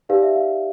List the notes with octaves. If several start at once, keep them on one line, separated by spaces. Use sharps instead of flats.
D#4 G4 B4 D5 F5
E5
F5